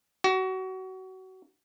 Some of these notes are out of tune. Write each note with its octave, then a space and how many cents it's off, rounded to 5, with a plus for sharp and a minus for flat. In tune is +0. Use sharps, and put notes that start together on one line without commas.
F#4 +25